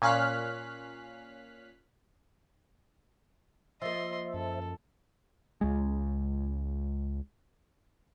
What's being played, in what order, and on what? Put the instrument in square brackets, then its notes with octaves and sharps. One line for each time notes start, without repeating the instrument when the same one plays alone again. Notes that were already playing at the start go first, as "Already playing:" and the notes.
[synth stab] A#2 C#4 F5 F6 F#6 B6
[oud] F3 A#3 [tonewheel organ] C5 E5 [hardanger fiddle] D#5 C6
[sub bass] F#2 [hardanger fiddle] A4
[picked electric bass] C#2 G#3